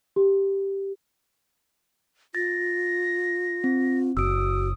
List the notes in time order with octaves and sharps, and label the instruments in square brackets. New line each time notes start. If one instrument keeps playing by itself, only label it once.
[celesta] G4
[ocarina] F4 [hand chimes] A6 [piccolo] A#6
[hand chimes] C4
[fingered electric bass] F#1 [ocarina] F#4 [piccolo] D#6 [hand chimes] E6 D7